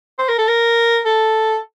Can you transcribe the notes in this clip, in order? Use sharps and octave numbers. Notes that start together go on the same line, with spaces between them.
C5
A#4
A4
A#4
A4